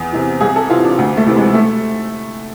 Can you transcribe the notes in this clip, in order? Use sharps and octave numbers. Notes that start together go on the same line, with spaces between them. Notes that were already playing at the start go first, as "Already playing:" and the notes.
Already playing: E2
C3 E3
C2 G#4
A4
C3 E3 F4
D4
D2
A3
C3 E3
G#3
A3